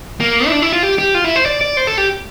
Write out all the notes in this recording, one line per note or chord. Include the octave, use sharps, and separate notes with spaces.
A#3
E4
D4
E4
F4
G4
G4
F4
E4
C5
D5
D5
C5
A4
G4